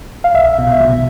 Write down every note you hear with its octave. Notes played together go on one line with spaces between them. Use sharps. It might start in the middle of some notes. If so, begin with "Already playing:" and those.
F5
B1 E5
B2
B2